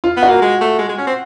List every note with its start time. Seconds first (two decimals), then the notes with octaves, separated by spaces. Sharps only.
0.04 F4
0.17 B3
0.23 F#4
0.29 A#3
0.42 G#3
0.61 A3
0.79 G#3
0.89 G#3
0.98 C#4
1.07 C4